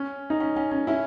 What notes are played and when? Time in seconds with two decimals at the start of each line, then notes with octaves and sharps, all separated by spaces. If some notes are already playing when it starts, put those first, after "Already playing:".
Already playing: C#4
0.30 D#4
0.40 C#4
0.56 C#4
0.71 C#4
0.87 C#4 E4